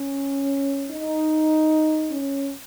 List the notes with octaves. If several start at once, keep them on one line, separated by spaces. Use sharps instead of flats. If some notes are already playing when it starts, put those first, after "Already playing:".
Already playing: C#4
D#4
C#4